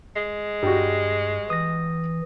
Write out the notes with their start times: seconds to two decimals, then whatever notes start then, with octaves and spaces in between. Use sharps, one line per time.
0.16 G#3
0.63 G2 G3 F#4
1.50 E3 D#6 A#6